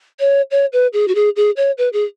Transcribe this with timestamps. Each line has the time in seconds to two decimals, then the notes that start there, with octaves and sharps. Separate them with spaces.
0.20 C#5
0.51 C#5
0.73 B4
0.93 G#4
1.08 F#4
1.15 G#4
1.36 G#4
1.57 C#5
1.78 B4
1.93 G#4